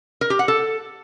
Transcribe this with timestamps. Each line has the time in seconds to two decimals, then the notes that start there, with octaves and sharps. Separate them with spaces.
0.21 A#4
0.30 G4
0.39 F#5
0.48 A4